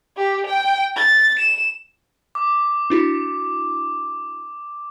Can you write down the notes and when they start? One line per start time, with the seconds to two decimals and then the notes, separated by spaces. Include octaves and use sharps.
0.17 G4
0.47 G5
0.96 A6
1.39 E7
2.35 D6
2.90 D4 E4 F#4